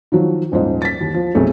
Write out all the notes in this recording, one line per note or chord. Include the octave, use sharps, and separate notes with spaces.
D#3 F3 F#3
D#1 G#2 F3 C5 D#5
A6 B6
D#2
F3
B1 F2 A3 G#4 A4